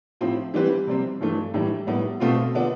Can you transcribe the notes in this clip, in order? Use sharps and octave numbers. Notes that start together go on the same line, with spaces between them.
A2 F3 C4
E3 G3 C4 G4 B4
C3 G3 C4
G2 E3 A3
A2 E3 G3
A2 G3 B3
B2 A3 C4 F4
D3 F3 B3 D4